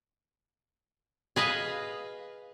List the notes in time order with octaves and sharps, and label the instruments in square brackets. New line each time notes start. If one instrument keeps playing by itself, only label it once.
[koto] G#4 B4 D#5 F5